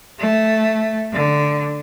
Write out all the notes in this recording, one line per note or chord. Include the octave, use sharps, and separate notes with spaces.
A3
D3